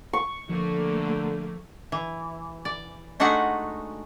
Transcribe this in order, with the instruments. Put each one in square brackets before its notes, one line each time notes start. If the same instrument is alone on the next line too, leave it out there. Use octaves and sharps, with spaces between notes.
[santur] C#6
[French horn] D3 [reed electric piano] F3 [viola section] A3 A#3
[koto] E3
D5
G#3 A3 D4 D#4 F#4 F#5